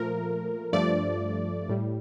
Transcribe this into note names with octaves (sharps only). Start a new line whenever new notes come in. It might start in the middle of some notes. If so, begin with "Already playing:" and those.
Already playing: A#2 F3 A3 A#4
G2 F3 A3 D5
A2 G3